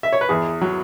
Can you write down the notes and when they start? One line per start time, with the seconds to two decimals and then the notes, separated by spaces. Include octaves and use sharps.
0.03 E5
0.13 C#5
0.21 B4
0.29 E2 G#4
0.61 F#3